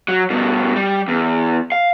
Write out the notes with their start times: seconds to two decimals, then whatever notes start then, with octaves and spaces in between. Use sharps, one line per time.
0.08 F#3
0.30 G2 B2
0.76 G3
1.08 E2
1.72 F5